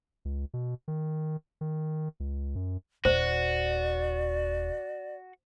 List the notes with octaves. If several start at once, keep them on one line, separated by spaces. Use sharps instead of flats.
C#2
B2
D#3
D#3
C#2
F#2
D#1 F#4 C5 D5